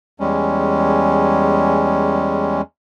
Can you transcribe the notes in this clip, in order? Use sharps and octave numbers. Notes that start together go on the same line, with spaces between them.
E2 G3 G#3 C#4